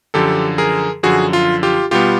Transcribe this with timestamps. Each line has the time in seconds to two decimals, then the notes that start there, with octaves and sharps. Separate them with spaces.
0.14 F#2 D3 F3 G4 A4
0.58 G#4 A#4
1.03 F#2 D3 F3 F#4 G#4
1.33 F4
1.63 F4 G4
1.91 B2 G3 B3 F4 G4